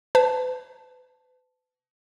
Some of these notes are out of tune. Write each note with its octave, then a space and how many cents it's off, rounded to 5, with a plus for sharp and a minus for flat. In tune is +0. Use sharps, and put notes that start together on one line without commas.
B4 +40 A5 +0